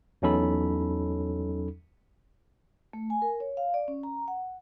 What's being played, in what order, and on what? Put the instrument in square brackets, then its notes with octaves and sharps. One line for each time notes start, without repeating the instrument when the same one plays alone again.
[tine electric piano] E2 F#3 C#4 D#4 A4 B5
[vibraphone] A3
G#5
A#4
C#5
F5
D5
C#4
A#5
F#5